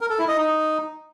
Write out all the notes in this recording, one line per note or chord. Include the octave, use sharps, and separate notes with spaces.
A#4
A4
E4
D#5
D#4